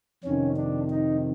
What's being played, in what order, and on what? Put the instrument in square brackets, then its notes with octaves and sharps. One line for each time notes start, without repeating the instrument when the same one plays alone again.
[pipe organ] F2 C3 D#3 C#4
D4
D#4